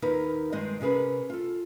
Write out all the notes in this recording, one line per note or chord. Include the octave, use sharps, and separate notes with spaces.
D#2 D#4 A#4 B4
G2 D#3 G#3 C4 D#5
C3 C#4 G#4 A#4 B4
F4 A4